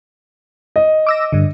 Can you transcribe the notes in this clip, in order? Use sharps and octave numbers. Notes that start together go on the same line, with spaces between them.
D#5
D6 E6 A#6
G2 D3